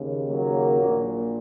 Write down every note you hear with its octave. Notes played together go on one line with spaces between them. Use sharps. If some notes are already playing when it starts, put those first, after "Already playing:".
Already playing: D#2 C#3
F#3 A#3
A#1 A#2